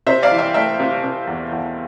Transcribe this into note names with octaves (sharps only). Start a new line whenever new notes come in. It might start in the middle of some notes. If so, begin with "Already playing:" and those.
C3 C5 E5
D5 F5
E3
E5 G5
A3 E5 G5
C3
C3
E2
E2